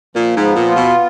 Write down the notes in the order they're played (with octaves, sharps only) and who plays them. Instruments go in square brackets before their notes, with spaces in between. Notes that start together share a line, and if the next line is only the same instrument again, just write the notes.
[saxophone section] A#2 [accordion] F3
[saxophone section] G#2
[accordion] B3
[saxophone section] A#2
[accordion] F4
[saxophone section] B2